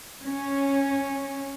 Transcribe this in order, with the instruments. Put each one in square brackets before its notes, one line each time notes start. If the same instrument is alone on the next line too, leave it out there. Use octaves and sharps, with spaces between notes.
[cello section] C#4